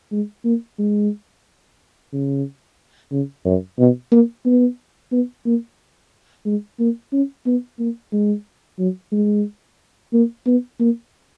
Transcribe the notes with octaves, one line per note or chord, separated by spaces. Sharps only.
G#3
A#3
G#3
C#3
C#3
F#2
B2
A#3
B3
B3
A#3
G#3
A#3
C#4
B3
A#3
G#3
F#3
G#3
A#3
B3
A#3